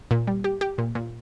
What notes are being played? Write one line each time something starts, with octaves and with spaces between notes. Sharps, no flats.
A#2
G3
G4
G4
A#2
A#2